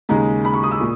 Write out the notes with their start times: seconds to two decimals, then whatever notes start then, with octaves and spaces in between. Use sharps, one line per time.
0.09 D#2 C#3 G#3 D#4 A#5
0.45 B5
0.54 C#6
0.63 D#6
0.71 E6
0.81 A#2